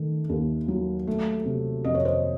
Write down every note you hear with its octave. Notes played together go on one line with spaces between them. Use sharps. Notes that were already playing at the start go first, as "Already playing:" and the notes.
Already playing: D#3 A3
D#2
F#3
A3
C3
F2 D#5
C#5
C5 D#5